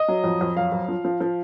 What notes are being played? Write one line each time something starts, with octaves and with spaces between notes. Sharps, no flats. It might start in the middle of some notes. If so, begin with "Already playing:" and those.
Already playing: D#5
F#3
F2
F2
F#2 F5
F#2
F3
F3
F3